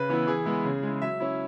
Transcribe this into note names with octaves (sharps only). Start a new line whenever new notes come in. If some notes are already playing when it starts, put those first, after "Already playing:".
Already playing: C#3 B4
E3 B3 E4
E3 G#4
G#3 B3 E4
C#3
G#3 E4
F#3 E5
C#4 E4